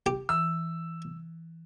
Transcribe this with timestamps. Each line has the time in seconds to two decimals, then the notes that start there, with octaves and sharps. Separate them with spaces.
0.06 G4
0.29 E3 E6